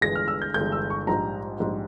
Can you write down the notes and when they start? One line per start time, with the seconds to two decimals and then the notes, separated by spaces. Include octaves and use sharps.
0.01 G1 G2 E3 G#3 A#6
0.16 F6
0.28 E6
0.42 G6
0.54 G1 G2 E3 G#3 G6
0.72 E6
0.90 C#6
1.07 A#1 G#2 G3 A#5
1.60 A#1 G#2 G3